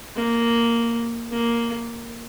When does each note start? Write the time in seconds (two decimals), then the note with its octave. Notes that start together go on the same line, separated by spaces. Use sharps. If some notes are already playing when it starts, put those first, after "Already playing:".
0.16 A#3
1.32 A#3